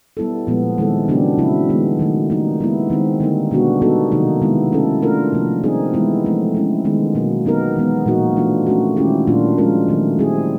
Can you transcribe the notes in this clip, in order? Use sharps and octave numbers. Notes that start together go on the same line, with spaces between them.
G3 B3 E4 A4
A#2 F3 G#3 B3
D#3 G#3 C4 E4 A4
C#3 F#3 B3 D4 G4
C#3 F#3 A3 C4 E4
D#3 G#3 B3
D#3 F#3 A3
G3 A#3 D#4
G#3 B3 E4
D#3 G#3 C4
D3 G3 A#3 D#4
B2 G#3 B3 D4 F#4
G3 B3 D#4 F#4 A4
C3 D#3 F#3 A#3 D#4
D#3 G#3 B3 E4
A3 C#4 E4 A4
A3 D4 F4 A#4
C3 F3 A#3
G3 C4 D#4 G#4
E3 G#3 B3 E4
F3 A3 C4
G#3 C#4 E4
D#3 G#3 B3
B2 F#3 A#3
F#3 B3 D#4 G4 A#4
E3 G#3 B3
A#2 F3 A#3 D#4 F#4
E3 A3 D4 F4
A3 C#4 F#4
D#3 G#3 C#4 E4 G4
A#2 F#3 A#3 D4 F4
F3 G#3 C#4 F4 A#4
D#3 F#3 A3
G3 C4 E4 G#4